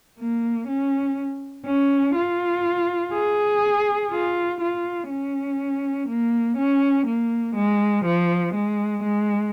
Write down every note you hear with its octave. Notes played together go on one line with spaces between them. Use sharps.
A#3
C#4
C#4
F4
G#4
F4
F4
C#4
A#3
C#4
A#3
G#3
F3
G#3
G#3